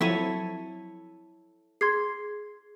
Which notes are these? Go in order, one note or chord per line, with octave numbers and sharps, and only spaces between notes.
F3 F#3 C4 E4 A4 C#5 B6 D#7
G#4 C6 G#6 C7